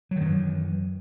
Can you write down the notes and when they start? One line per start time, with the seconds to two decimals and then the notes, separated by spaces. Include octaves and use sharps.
0.11 F#3
0.16 D#3
0.21 F#2
0.26 E3